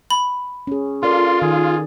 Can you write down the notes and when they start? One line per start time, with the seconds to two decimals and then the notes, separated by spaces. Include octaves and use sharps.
0.11 B5
0.67 C#4 G#4
1.03 F4 A4 A#4 D5 C6
1.42 D#3 G#4